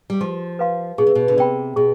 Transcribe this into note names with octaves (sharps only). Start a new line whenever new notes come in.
G3
F3 G4
B4 F5 C6
B2 G#4
C3
B2
D3
C3 D5 G5 B5
B2 G#4